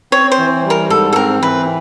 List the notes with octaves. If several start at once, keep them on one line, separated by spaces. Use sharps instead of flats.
C4 C#5
C5
E3
G3
A#4
G#2 A4
A4
C4 A#4
E3 B4